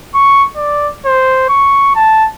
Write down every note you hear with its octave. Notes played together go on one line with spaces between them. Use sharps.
C#6
D5
C5
C#6
A5